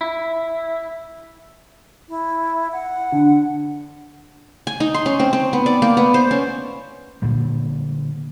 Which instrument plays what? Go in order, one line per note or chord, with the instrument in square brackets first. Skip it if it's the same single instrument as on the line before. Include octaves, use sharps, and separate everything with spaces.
[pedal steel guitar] E4
[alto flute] E4
F#5
[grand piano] D3
[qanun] G#5
D#4
C6
C#4
C4
C4
B3
D5
A#3
B3
C5
C#4
[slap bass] A#2 D3 G3